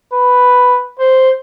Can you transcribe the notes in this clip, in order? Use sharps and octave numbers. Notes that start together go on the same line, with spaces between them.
B4
C5